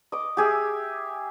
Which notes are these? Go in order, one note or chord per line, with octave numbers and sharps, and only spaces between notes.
D#5 D6
G4 G#4 E5